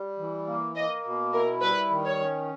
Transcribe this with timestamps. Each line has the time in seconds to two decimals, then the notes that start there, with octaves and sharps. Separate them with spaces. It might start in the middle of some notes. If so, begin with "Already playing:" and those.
Already playing: G3
0.18 E3
0.46 A#3
0.75 A#3 D#5
1.04 B2
1.33 E4 A#4
1.61 G3 B4
1.90 D#3
2.05 C#5
2.20 C#4